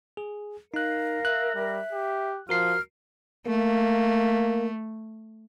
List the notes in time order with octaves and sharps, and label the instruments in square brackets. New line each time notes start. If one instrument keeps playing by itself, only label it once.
[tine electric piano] G#4
[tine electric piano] D#4 F#6 [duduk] A#4 [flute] F5
[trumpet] E5 [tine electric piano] F#6
[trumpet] G3 [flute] E5
[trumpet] G4
[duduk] F3 [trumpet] F4 [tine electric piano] F#4 A#4 C7 [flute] F6
[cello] A3 [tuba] A#3